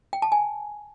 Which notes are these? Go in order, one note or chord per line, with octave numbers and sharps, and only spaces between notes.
G5
A5
G#5